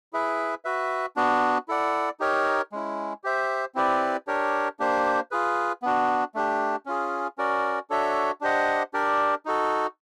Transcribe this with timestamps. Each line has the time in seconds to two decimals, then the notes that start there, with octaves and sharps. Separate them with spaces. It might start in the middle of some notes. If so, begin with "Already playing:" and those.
0.13 E4 G#4 B4 E5
0.65 F#4 B4 E5
1.16 B3 D4 F#4
1.68 E4 A4 D5 F#5
2.20 D#4 G4 A#4 C#5
2.72 G#3 C#4 E4
3.24 G4 C5 E5
3.75 C4 E4 G4 B4 D5
4.27 D4 G4 A#4 C#5
4.79 A#3 D4 G4 C5
5.31 F4 G#4 B4
5.82 B3 D4 F#4
6.35 A3 D4 G4
6.86 C#4 F4 G#4
7.38 C#4 F#4 A#4 D5
7.90 D4 F#4 A4 C#5 E5
8.41 D4 G4 C5 D#5 F#5
8.94 D4 G4 A#4 D5
9.45 D#4 F#4 A4